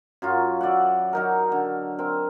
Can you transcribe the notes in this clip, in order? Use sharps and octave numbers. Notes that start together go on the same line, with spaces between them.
F#2 F#3 F4
F#4 D5 E5 F#5
F#3 D#4 A#4
D3
C4 A#4